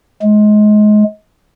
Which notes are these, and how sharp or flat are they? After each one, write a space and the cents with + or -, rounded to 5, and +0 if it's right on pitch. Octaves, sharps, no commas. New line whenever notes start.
G#3 +25